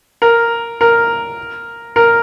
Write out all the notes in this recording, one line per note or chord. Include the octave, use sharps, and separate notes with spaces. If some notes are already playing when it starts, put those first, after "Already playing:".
A#4
A#4
A#4